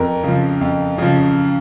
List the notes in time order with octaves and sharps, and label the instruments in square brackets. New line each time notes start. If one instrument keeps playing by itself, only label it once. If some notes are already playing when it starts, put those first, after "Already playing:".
Already playing: [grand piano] F2 A#4
C#3 F3
F2
C#3 F3